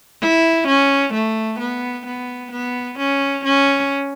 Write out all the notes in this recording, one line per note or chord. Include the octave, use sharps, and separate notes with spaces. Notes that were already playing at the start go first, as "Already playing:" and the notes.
E4
C#4
A3
B3
B3
B3
C#4
C#4